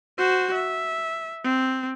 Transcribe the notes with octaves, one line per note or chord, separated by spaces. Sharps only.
F#4 C5
E5
C4